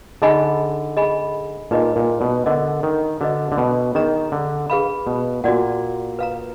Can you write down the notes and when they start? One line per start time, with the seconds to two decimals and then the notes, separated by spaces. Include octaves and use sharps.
0.22 D3 D#4 G#4 D#5 G#5 B5
0.97 G#4 D#5 G#5 B5
1.71 A#2 D#4 G#4 B4 D#5
1.96 A#2
2.21 B2
2.46 D3 A#4 D#5 F#5
2.83 D#3
3.21 D3 F#4 B4 D#5
3.52 D3
3.58 B2
3.95 D#3 D4 G#4 D#5 A#5
4.32 D3
4.70 G#4 B4 F5 B5
5.07 B2
5.44 A#2 F#4 D5 F#5
6.19 B4 F5 A#5